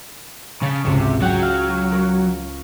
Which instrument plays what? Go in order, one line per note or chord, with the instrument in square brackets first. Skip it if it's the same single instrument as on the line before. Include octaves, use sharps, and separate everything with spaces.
[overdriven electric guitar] C#3 [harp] A5 B6
[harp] G#1 C#2 [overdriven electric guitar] C3
[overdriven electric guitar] F#3 [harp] F#5 G5
[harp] F5
A#4 C#6